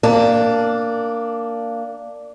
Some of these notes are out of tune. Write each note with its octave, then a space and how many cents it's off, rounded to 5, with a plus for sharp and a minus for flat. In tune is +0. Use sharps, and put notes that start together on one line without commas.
A#3 -10 D4 +0